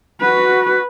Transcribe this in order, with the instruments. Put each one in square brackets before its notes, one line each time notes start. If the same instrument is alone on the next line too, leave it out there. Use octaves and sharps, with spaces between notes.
[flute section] F#4 [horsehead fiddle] B4